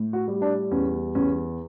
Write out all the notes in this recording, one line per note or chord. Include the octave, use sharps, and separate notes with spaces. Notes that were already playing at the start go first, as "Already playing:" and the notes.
Already playing: A2
F#4
G3
D4
E2 C#4
E2 C#4